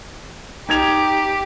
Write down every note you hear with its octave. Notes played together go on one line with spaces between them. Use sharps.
D#4 G4 G#6 F7